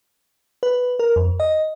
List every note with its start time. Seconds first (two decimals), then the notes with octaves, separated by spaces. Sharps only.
0.63 B4
0.99 A#4
1.16 F2
1.40 D#5